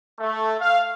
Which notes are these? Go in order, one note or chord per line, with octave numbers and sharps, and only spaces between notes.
A3
F5